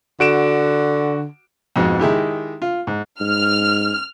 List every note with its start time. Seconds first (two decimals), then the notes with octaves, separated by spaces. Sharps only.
0.20 D3 F#4 D7 E7
1.76 F2 G#2 B2
2.00 D#3 G#3 E4 G4
2.62 F4
2.87 G#2
3.20 G#2 F6